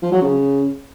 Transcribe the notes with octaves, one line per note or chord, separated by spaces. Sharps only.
F3
F#3
C#3